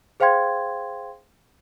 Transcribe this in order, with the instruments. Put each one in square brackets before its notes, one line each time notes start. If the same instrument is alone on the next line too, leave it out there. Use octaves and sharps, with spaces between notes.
[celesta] G#4 C5 F5 G5 C6 G#6